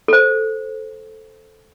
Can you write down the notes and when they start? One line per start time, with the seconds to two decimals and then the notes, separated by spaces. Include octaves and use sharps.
0.08 A4 C5